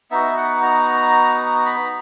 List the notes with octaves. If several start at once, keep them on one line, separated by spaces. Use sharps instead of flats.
B3 D#4 F#4 E5
F#5
A#5
B5